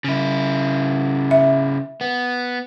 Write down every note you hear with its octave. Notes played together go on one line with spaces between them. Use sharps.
C#3 E4
E5
B3